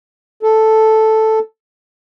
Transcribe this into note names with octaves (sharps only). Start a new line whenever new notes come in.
A4